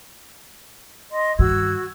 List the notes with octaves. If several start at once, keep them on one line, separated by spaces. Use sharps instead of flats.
D#5 C6
G2 D#3 F#4 E6 G#6